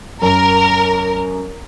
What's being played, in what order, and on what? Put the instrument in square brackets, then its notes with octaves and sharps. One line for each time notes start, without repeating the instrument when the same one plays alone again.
[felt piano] F#2 [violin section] A#4